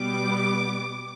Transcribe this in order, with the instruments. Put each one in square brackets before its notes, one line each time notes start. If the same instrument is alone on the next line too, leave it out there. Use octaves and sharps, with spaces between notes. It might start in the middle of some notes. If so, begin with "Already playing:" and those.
Already playing: [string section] B2 G3 B3 D6